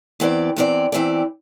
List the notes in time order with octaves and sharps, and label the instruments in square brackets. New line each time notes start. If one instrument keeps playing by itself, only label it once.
[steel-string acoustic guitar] E2 E3 C4 G4 D5
E2 E3 C4 G4 D5
E2 E3 C4 G4 D5